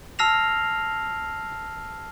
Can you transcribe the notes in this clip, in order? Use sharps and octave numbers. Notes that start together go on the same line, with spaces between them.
A5 E6 F6 A#6 C7 F7